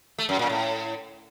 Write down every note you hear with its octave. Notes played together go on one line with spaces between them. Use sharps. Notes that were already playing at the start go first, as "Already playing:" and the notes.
A3
F#2
A#2
A2